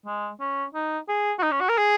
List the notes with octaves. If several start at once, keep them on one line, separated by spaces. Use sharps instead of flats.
G#3
C#4
D#4
G#4
F#4
D#4
C#4
F#4
A#4
G#4